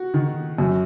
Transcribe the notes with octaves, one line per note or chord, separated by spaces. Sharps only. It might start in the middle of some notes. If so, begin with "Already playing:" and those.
Already playing: F#4
D#3
F#2